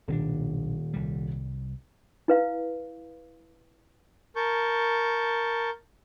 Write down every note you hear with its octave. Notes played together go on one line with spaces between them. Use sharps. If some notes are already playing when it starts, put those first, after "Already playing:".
D#1 B1 C4 D4
C2 G3
E4 B4 F5
A#4 A5 C#6 G6